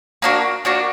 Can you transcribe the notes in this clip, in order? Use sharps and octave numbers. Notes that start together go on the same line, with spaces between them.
A#3 D4 F#4
A#3 D4 F#4